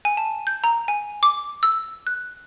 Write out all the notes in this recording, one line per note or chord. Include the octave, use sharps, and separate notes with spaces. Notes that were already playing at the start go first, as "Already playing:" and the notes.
G#5
A5
G6
A#5
G#5
D6
E6
F#6